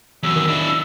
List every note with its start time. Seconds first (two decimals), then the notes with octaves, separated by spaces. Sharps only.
0.23 E2 F#3 E6
0.36 D#3
0.48 D4 E4